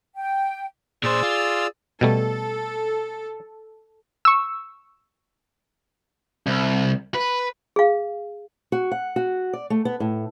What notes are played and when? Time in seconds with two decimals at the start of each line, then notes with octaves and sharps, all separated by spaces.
0.15 G5
1.03 A#2 G#4 C5 D5 E6
1.23 F4
2.01 B2 G3 A3 A4
4.25 C#6 E6
6.47 C2
7.15 B4
7.76 G#4 F5
8.72 F#4
8.91 F#5
9.16 F#4
9.53 D5
9.70 A3
9.85 B3
10.00 A2